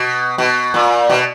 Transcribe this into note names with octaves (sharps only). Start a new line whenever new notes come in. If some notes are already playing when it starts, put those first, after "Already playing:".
Already playing: B2
B2
A#2
B2